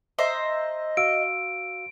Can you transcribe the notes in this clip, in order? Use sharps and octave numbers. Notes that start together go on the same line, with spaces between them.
C5 D#5 E5 A#5
F#4 F5 E6 D7